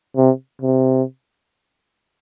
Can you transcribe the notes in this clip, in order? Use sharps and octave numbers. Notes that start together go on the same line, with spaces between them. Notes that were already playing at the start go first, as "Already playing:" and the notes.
C3
C3